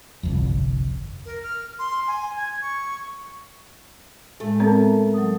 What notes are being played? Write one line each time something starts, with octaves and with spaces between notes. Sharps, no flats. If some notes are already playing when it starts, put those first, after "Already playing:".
G1 C2 F2
A#4
F6
C6
G#5
G#6
C#6
A2 G#3 A3
B3 C4 A4 A#4 A5
F#3 D#6